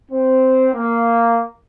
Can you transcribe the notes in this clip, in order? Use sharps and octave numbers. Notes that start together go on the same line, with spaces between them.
C4
A#3